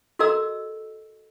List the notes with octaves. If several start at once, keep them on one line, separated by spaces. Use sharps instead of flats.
F#4 A4 A#4 D#5 A#5 E6